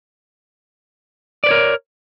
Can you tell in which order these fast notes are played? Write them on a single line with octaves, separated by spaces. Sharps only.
D5 B4 C#5 A#4